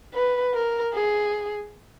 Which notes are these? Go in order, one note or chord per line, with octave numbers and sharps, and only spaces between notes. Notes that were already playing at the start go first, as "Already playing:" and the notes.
B4
A#4
G#4